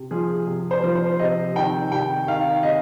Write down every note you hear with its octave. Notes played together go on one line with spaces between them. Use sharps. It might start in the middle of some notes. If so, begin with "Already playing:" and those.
Already playing: C3
F3 G#4
C3
C5
F3
C5
C3 D#5
D#3 G5
C3 G5
D#3 F5
C3 D#5